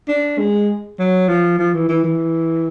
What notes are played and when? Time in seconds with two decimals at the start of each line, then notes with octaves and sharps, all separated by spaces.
0.08 D4
0.38 G#3
0.99 F#3
1.28 F3
1.59 F3
1.74 E3
1.89 E3
2.04 E3